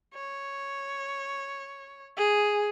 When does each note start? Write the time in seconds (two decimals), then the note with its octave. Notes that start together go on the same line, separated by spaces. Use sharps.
0.14 C#5
2.17 G#4